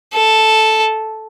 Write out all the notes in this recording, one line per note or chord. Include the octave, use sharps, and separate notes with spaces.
A4